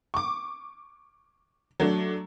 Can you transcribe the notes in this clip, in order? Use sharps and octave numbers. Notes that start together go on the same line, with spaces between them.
C#6 D6
F#3 A3 D4